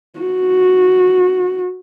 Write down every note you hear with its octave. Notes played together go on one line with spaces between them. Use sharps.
F#4